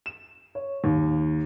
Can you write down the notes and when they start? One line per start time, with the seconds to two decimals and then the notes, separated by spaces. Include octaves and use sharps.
0.06 E7
0.55 C#5
0.84 D#2